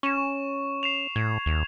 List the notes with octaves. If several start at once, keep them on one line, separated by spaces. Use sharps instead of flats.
C#4 C#6 E7
C7 E7 F7
A2 G#6
D#2